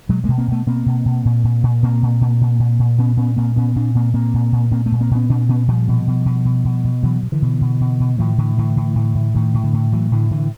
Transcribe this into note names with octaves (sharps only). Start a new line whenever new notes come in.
B2 F#3 G#3
B2 G#3 A#3
A#3 C4
B2 A3 B3
B2 A#3 C4
B2
B2
A#2
A#2
A#2
A#2 A#3 C4
A#2
A#2
A#2
A#2
A#2
A#2 B3 C#4
A#2 B3 C#4
A#2 A#3 C4
A#2 B3 C#4
A#2 C4 D4
A#2 A#3 C4
A#2 A#3 C4
A#2
A#2
A#2 A#3 C4
A3 B3
A#2
A#3 C4
A#2 B3 C#4
A#2 C4 D4
A#2 B3 C#4
A#2 F3 G3
B2
B2
B2
B2
B2
B2
B2 E3 F#3
B2
D3 E3
B2
B2
B2
B2
A2 D#3 F3
A2 D3 E3
A2 D3 E3
A2
A2
A2
A2 D#3
A2
D3
A2
A2 E3 F#3
A2 D3 E3
A2 D3 E3